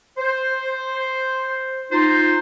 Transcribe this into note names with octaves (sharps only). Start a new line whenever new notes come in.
C5
D#4 F4 C5